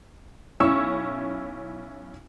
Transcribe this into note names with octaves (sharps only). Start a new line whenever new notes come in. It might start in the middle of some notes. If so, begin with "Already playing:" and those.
B1 C#4 E4 C#6 E6